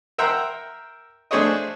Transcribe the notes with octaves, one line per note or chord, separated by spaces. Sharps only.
A#4 E5 F#5 G5 A#5 C6
A3 D4 G#4 C5 C#5 D#5